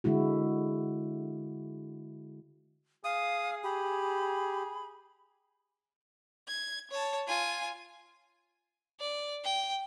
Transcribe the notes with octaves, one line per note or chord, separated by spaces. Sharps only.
D3 G#3 E4 F#4
G#4 F5 D#6
G4 B5
G#6
C#5 A5
F4 G#5
D5
G5